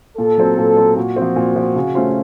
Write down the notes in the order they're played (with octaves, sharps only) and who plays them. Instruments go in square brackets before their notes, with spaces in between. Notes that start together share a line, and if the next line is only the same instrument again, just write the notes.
[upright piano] A#2 [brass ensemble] A4
[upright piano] F#3 C4
A#2
F#3 C4
[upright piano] A#2 [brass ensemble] F#4
[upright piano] F3 C4
A#2
F3 C4
C#3
A3 C#4 F4 C5